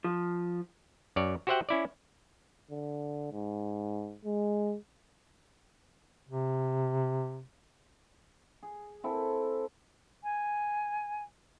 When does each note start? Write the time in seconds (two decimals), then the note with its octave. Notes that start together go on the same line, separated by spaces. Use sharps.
0.04 F3
1.16 F#2 C#5 D5
1.47 F#4 G4 C5 E5 F#5 G5
1.69 C#4 E4 D5
2.71 D3
3.32 G#2
4.25 G#3
6.29 C3
8.62 G#4
9.04 C4 E4 A4
10.23 G#5